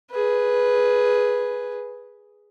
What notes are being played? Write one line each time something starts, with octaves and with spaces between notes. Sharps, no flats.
G#4 B4